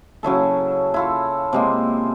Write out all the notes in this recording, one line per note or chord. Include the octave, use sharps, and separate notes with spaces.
C#3 F#3 E4 A4
E4 F4 A4
C3 G#3 A#3